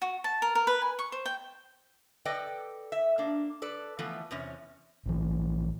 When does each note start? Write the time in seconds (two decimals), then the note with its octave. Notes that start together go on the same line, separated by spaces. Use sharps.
0.02 F#4
0.24 A5
0.42 A#4
0.55 A#4
0.67 B4
0.82 G#5
0.99 C#6
1.12 C5
1.26 G5
2.25 A4 B4 D5 D#5 G5
2.92 E5
3.18 A#3 D4
3.62 A4 B4 D5
3.99 E3 F3 A3 B3
4.31 E2 C3 C#4
5.06 A#1 E3